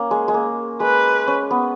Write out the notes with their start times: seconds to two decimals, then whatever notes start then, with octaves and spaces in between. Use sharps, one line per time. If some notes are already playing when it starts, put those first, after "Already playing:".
Already playing: A#3 C#4
0.11 G#3
0.28 G#3
0.34 A#3
0.80 G#3 B4
1.27 C#4
1.51 B3